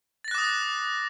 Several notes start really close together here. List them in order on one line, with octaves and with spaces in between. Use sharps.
A6 A#6 F#6 D6 D#6